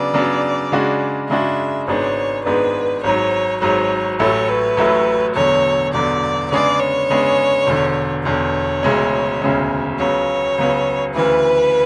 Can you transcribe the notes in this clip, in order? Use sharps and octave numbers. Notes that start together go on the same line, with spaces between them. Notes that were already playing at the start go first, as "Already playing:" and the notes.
Already playing: C#3 F#3 B3 D4 D5
C#3 F#3 B3 D4
C#3 G#3 D4 F#4
C#3 G#3 D4 F#4 E5
G#1 G#2 G#3 B3 D4 C#5
G#1 G#2 G#3 B3 D4 B4
G#1 G#2 F#3 C#5
G#1 G#2 F#3 C#5
A1 A2 F#3 A3 E4 C#5
B4
A1 A2 F#3 A3 E4
E1 E2 D3 F#3 C#5
E1 E2 D3 F#3 D5
C#3 G#3 B3 D4 G#4 D5
C#5
C#3 G#3 B3 D4 G#4
E1 E2 D3
E1 E2 D3 C#5
E1 D2 C#3 G#3 C#4
E1 D2 C#3 G#3 C#4
C#2 C#3 F#3 B3 C#5
C#2 C#3 F#3 B3
D2 C#3 E3 B4